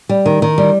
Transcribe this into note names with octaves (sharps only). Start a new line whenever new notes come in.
G3
D#3
D#3
G3